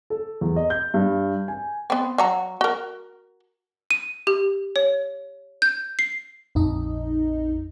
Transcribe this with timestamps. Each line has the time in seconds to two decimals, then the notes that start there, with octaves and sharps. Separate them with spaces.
0.10 A4
0.41 E2
0.56 D#5
0.70 G6
0.94 G2
1.48 G#5
1.90 B3 C4
2.18 F#3 F#4 A#5
2.61 F#4 A#4
3.90 D#7
4.27 G4
4.76 C#5
5.62 G6
5.99 C7
6.55 A#1 F2 D#4 D#5